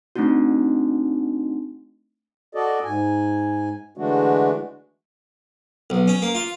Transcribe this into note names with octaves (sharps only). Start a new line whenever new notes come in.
A3 C4 D4 D#4 F#4
F#4 A4 D5 D#5
G#2 G#5
D3 E3 G#3 A3 D4 F#4
B1
C#4
A#3
F4